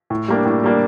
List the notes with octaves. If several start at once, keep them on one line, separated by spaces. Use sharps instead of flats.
A2
G3 A#3 D4
A2
G3 A#3 D4